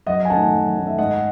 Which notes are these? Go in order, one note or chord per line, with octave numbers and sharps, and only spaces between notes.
F#2 D#5 F#5
G#5
D#3 A3 C#4 F#5 A5
F#2
D#3 A3 C#4
E5
G#2 D#5 F#5